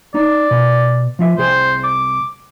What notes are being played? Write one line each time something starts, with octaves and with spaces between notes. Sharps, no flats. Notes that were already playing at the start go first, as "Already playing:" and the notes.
D#4 D5
B2
F3 F4 E5
C2 G#4 C5 G5
D6